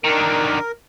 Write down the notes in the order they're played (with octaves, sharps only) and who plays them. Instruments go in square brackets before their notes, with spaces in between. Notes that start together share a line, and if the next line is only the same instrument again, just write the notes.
[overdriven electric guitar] D3 D#3 [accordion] A#4